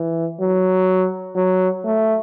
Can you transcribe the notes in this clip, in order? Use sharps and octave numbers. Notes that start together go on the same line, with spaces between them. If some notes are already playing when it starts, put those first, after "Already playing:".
Already playing: E3
F#3
F#3
A3